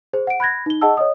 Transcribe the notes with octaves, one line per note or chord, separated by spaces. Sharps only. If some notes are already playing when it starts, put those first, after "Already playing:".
G#4 C5
F#5 D7
B5 F#6 G#6 A#6
D#4 G7
G#4 D#5 F#5 A5 E6
C#5 D#5 D#6